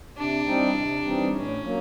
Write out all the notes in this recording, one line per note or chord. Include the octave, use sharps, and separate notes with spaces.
C3 D4
E3 G3 C4 D#4
C3
E3 G3 C4 D#4
A2 C#4
F#3 A#3